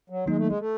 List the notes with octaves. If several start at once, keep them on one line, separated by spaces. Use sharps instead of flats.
F#3
D#3 F#3 G#3 A#3 D#4
A3
G#3
A3